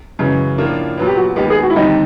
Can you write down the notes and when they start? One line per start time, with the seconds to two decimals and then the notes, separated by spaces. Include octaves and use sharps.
0.19 F#2 C#3 E3 G#3 C#4
0.58 A2 F3 A#3 D4 F4
0.98 A#2 F#3 B3
1.07 G4
1.17 F#4
1.36 D#2 D#3 G#3 B3 G4
1.50 G#4
1.63 F#4
1.70 E4
1.76 D#2 D3 G3 C4 D#4